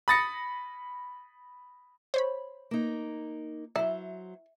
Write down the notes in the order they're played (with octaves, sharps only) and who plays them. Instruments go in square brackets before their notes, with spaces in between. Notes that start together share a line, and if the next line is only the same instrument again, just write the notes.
[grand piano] B5 D#6 A6 A#6 C#7
[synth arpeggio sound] C5 C#5 B5
[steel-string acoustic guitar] A#3 D#4
[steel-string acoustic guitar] F#3 C5 [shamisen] E4